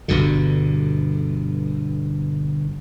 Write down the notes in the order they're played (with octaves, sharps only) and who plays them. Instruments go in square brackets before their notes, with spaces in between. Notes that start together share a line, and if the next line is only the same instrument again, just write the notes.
[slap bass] G1 G2 B2 D3